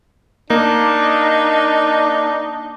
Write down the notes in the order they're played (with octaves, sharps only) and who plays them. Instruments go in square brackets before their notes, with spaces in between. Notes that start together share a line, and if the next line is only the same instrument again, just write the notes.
[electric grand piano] A#3 [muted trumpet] D4 [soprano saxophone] D#4